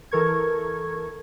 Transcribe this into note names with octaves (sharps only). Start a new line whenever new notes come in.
E3 A4 A#4 C#6 G#6